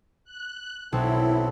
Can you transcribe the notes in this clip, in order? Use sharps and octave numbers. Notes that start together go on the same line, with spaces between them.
F#6
B1 C4 E4 A4